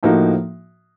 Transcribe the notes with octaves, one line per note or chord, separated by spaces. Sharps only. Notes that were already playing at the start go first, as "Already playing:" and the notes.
A2 F3 A#3 D#4 F#4